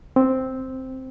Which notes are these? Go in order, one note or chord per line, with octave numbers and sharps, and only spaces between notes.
C4